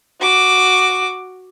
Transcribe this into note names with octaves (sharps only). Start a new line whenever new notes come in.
F#4 D6